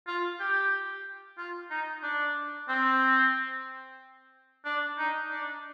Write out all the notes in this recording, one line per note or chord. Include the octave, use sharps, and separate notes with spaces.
F4
G4
F4
D#4
D4
C4
D4
D#4
D4